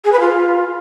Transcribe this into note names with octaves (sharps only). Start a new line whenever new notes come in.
G#4
B4
F4